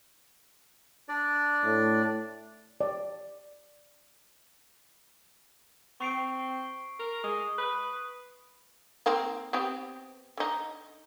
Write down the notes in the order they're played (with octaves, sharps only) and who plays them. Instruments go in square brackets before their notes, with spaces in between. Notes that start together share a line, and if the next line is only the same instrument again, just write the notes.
[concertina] D4 D5
[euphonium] A2
[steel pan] D5
[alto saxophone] C4 [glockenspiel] C#6 C7 D7
[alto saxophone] A#4
[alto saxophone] G#3 [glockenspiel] D#6
[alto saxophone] B4
[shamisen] D#3 A#3 C4
B3 C4 G4
D3 D#4